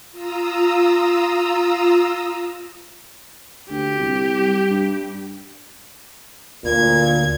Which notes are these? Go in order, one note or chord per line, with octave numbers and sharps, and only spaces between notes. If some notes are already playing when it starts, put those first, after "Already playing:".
F4 A#5 D#6 E6
D2 G4
C2
G3
G2
D2 A#2 G#6